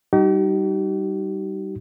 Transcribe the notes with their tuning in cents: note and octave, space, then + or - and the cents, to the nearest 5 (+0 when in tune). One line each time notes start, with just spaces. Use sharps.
G3 -10 D#4 +0 G4 -45